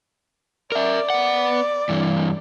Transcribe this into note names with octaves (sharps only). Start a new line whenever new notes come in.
A#4 D5 E5
B3 F#5
G2 E3